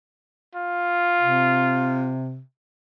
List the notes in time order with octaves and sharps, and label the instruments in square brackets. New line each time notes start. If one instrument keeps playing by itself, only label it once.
[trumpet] F4
[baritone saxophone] C3